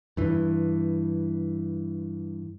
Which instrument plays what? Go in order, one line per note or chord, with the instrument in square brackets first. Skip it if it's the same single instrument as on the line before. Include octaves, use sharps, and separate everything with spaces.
[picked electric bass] G2 E3